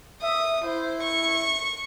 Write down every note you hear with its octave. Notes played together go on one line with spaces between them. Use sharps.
E5 D#6
E4 C5
C#6